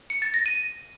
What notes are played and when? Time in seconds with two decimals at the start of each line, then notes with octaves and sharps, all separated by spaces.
0.10 C#7
0.22 A6
0.34 A#6
0.46 D#7